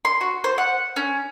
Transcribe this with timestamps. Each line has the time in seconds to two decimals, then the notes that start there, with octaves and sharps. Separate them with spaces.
0.05 C6
0.21 F#4
0.44 C5
0.58 F#5
0.96 C#4